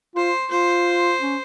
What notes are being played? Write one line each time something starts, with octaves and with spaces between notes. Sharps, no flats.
F4 C5
F4 C5
C#4